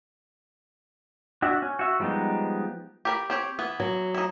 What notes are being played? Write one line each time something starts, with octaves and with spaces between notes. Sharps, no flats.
D4 F#4 E5 F#5
C#4
F#4 E5
F3 G3 G#3 B3 D#4
G4 A#4 B5
C4 G4 C#5
E3 B3
F#3
D#4 E4